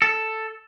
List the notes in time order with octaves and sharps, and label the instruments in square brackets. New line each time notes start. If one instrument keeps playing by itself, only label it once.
[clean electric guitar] A4